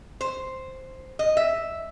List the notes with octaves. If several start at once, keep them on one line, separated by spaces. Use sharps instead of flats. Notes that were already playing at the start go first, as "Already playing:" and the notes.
C5
D#5
E5